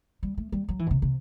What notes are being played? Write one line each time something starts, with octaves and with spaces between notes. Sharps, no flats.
G3
A3
G3
F#3
E3
B2
C3
C3